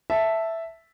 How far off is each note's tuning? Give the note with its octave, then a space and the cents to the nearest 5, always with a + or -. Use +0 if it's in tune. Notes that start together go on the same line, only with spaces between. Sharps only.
E5 +0 A5 +0